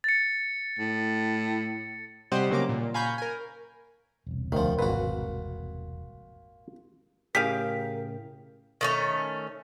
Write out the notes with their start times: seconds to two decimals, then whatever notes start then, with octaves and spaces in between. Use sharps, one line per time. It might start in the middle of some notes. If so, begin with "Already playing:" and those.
0.04 A6 C#7
0.79 A2
2.32 C3 G3 G4 C5 D#5 F#5
2.50 C#3 F#3 A#3 A#5 D6
2.69 A#2
2.94 F5 G#5 A#5 B5 C#6 G6
3.18 A#4 G#5
4.27 E1 C2
4.52 D2 D#3 F3
4.79 G#1 A#2 F#4 B4
7.35 A2 C#3 G4 G#4 A#4 F5 G5 B6
8.81 D#3 A3 C#4